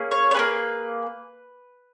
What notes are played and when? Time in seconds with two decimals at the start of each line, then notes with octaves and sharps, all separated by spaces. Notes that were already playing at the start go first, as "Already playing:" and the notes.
Already playing: A#3 C#4 G#4
0.11 C#5
0.31 C#5
0.34 A#3 C#4 G#4 B4